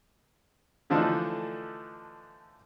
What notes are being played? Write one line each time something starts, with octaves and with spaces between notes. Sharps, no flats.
D3 E3 F3 A3 D4 D#4